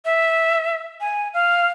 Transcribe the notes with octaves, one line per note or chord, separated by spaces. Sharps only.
E5
G#5
F5